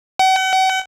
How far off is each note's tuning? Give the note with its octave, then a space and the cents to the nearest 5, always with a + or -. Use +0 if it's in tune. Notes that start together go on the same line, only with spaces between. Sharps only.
F#5 +40